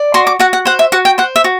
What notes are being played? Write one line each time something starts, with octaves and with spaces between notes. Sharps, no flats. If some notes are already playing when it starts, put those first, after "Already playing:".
Already playing: D5
F#4 C6
D6
F#4 F#5
F#5
C5 F#5
E5
F#4 F#5
G5
C5 F#5
E5
F#4